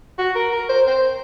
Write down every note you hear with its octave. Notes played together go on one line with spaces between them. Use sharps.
F#4
A#4
A#4
C5
C5